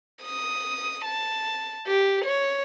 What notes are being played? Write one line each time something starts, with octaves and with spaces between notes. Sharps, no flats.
D#6
A5
G4
C#5